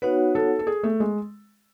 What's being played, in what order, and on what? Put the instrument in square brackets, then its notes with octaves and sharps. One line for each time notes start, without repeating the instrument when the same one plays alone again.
[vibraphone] B3 D#4 F#4 C#5 F#5 [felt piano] B4
[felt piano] A4
A4
G#4
A3
G#3